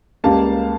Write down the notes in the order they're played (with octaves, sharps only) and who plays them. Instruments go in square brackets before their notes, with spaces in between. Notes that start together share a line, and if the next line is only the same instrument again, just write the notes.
[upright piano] C#2 C#3 G3 A#3 F5 A5